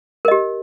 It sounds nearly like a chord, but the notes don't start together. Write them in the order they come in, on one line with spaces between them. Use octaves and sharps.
A#4 D#5 G4